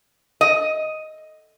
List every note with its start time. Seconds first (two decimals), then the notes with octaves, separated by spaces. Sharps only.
0.41 D#5